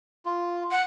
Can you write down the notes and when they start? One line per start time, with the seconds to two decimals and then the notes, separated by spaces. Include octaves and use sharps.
0.26 F4
0.71 F#5